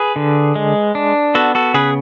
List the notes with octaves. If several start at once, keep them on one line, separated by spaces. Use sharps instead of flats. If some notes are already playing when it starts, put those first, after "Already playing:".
Already playing: G#4 B4
D3
G#3
D4
B3 F#4 A4
F#4 A4
C#3 G#4 B4